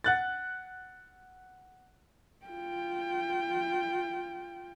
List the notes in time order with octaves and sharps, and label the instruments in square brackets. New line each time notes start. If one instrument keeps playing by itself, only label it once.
[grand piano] F#5 F#6 A6
[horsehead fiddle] F4 G5